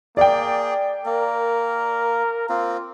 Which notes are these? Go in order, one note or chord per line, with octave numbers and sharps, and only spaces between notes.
A#3 G#4 D5 G5
A#3 A#4
A#3 C4 F4